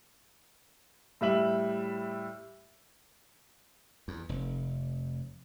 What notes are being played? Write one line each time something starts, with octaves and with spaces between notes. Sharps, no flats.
A2 G3 E5 F#7
E2
F1